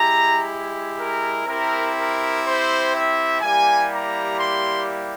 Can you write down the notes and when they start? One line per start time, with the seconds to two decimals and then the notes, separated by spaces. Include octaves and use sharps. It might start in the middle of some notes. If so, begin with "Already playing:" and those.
Already playing: G#3 E4 G4 A#5
0.99 A#4
1.47 C4 E4 G4 A#4
1.96 A#4
2.45 C5
2.94 E5
3.41 G3 A#3 E4 G4 G#5
3.91 A#5
4.38 C6